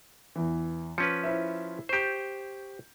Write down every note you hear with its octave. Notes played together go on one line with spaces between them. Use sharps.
E2 E3
F3 C#4 B4 C#7
E4 C5 E5
G4 C5 C#6 G6